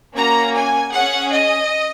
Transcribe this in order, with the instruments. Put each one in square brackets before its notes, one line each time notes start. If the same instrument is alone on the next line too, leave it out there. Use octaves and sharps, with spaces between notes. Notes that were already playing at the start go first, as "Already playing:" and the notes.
[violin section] A#3 C#4 F#4 A#5
G#5
C#4 G#4 F#5
D#5